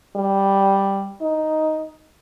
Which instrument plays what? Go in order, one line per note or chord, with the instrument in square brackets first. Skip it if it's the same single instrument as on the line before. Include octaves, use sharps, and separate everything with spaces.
[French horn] G3
D#4